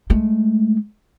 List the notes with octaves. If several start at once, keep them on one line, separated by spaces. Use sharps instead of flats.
G#3 A3